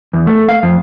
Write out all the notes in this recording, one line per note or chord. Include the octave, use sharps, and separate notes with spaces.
E2
A3
F5
F2